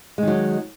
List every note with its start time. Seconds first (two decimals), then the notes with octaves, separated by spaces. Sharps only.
0.18 G#3
0.23 D#3
0.28 F#3